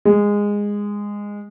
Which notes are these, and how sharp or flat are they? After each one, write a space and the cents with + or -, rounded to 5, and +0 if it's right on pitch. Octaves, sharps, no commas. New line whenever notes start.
G#3 -15